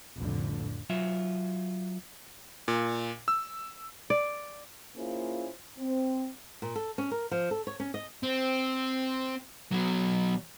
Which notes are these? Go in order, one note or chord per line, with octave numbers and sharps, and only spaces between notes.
F1 C2 F2 A2 D3
F#3 F4 E5
A#2
E6
D5
A#3 C#4 E4 F4 G#4 C5
C4
A#2
A4
C#4
A#4
F3
A4
C#5
C#4
D#5
C4
B2 F#3